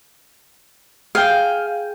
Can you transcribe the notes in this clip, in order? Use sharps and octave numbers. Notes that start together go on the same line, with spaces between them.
G#4 F5 G5